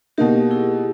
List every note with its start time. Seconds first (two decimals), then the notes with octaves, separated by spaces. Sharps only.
0.18 B2 A#3 D#4 G4 A#4
0.51 E4 G#4